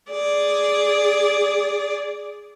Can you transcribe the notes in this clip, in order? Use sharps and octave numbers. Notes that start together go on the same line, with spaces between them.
G#4 D5